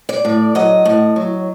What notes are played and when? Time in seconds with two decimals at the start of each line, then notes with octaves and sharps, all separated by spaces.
0.09 D5
0.25 A2
0.55 F#3 D#5
0.85 A2
1.16 F#3